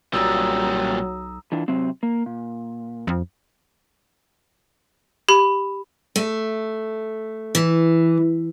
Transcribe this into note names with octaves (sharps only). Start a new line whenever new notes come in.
B1 A#2 F#3 G3 A#5 D#6 E6
E3 D4 F4
C3 F#3 C4
A#3
A#2
F2
G4 B5
A3
E3